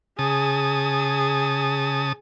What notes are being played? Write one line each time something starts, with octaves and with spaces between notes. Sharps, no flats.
C#3 G#4 A5 D#6